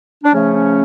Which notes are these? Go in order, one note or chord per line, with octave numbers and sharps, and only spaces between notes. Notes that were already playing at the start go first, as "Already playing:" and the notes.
D4
C#3 F3 A3 C#4
C#4